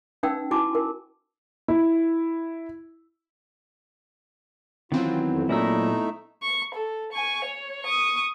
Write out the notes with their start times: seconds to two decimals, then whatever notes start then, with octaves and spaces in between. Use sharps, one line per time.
0.23 C#4 D#4 B4 F#5 G5 E6
0.51 E4 F#4 G#5 A5 C6 D6
0.75 A#4
1.68 E4
4.92 D#3 E3 F#3 B3 C4 F4
5.29 F2
5.49 A#2 F#3 A3 D#4 E4 E5 A#5 E6
6.42 C#6
6.75 A4
7.12 G#5 C#6
7.45 C#5
7.84 C#6 D#6